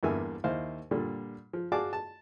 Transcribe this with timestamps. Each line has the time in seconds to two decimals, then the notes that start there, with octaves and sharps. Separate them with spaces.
0.03 E2 G2 D3 A#3 E5 G#5
0.44 D#2 E4 C5 F5
0.91 A#2 D3 G3
1.53 F3
1.72 F#4 G#4 D5 F5 A5 D6
1.93 A5